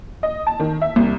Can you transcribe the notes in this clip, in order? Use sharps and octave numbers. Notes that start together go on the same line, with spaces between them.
D#5
A5
D#3
E5
C2